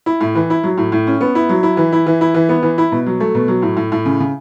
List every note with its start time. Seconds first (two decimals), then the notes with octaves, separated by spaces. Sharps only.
0.06 E4
0.21 A2
0.35 E3
0.50 E4
0.63 F#3
0.78 A2
0.92 A2
1.07 C#4
1.21 B3
1.35 E4
1.49 F#3
1.63 E4
1.77 E3
1.92 E4
2.06 E3
2.21 E4
2.34 E3
2.49 B3
2.63 E3
2.78 E4
2.92 B2
3.06 F#3
3.20 A3
3.35 B2
3.48 F#3
3.62 A2
3.77 A2
3.92 A2
4.05 C#3
4.20 C#3